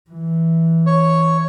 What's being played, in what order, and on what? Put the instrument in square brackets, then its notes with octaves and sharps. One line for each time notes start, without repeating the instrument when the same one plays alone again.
[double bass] E3
[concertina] C#5